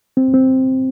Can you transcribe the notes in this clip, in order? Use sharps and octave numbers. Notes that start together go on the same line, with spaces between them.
C4
C4